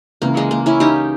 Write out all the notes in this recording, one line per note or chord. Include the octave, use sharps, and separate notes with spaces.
C#2 C#3 E3 A#3
G#3
A#3
C#4 E4
D#4 G4